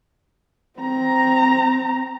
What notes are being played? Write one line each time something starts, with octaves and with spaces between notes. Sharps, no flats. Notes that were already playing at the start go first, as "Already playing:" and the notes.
C4 A#5